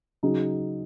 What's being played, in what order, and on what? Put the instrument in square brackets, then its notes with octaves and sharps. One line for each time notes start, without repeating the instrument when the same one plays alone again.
[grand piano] C#3 F#3 D#4